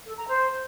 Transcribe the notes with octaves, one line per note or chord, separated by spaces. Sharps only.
A4
A#5
C5